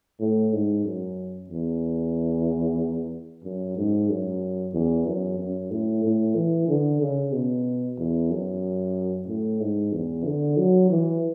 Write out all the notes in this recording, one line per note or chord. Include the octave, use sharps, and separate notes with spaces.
A2
G#2
F#2
E2
F#2
G#2
F#2
E2
F#2
F#2
A2
A2
E3
D3
C#3
B2
E2
F#2
A2
G#2
E2
D3
F#3
E3